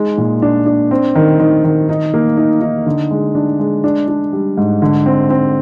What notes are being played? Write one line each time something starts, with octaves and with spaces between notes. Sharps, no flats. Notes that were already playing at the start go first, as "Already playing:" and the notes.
Already playing: G#3 D#4
A#2
D4
D4
C4
D#3
D#3
D#3
D#4
A#3
D#4
D#4
D3
G#3
D4
G#3
D4
D4
G3
G#2
D3
C4
C4